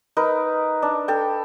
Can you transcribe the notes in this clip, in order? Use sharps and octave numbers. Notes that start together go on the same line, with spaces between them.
D#4 A#4 B4
D4
A4 G5